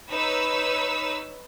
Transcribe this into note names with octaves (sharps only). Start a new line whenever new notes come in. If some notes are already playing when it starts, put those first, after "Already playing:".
D#4 B4 C#5 E6 B6